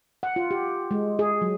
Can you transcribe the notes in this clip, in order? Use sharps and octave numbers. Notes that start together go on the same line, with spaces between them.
F#5
F4
G4
G#3
G#4
F#3